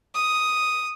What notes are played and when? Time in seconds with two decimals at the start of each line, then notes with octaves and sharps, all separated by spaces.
0.14 D#6